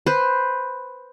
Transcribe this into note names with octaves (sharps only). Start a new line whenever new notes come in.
B4 C5